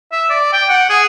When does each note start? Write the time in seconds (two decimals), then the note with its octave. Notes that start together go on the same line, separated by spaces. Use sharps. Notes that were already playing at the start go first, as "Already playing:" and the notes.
0.12 E5
0.30 D5
0.53 G5
0.69 F#5
0.89 G#4